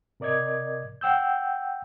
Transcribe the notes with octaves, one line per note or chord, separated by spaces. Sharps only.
C3 A#4 D5 D#5 G#6
F#5 G5 E6 G6